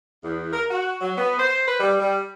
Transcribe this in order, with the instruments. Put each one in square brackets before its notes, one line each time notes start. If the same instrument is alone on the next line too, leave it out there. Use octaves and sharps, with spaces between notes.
[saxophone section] E2
A#4
F#4
F#3
B3
C5
B4
G3
G3